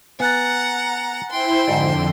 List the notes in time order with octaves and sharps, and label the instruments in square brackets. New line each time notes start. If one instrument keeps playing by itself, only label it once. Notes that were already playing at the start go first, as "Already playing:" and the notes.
[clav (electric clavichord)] B3 [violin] F#5 A#5 [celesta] G#5 F#6 A6
[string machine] E4 C5 [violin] G5 C6
[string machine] F2 D3 [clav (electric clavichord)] G#2 F#4 D5